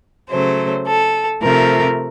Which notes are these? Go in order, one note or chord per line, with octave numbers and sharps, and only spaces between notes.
C#3 F#3 A3 C5
A4
C3 F3 A3 A#4